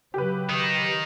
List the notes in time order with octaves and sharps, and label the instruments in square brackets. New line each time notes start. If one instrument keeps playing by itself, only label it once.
[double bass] C#3 F#3 [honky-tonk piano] G4 B4
[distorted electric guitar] D#3 D#4